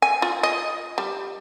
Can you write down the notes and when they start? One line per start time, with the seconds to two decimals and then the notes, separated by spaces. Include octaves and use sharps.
0.02 G#5
0.22 F4
0.43 D#5
0.98 G3